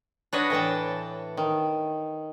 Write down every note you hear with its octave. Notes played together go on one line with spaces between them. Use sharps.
D4 F#4 B4 C#5 D#5
A2 E3 G5 A5
D#3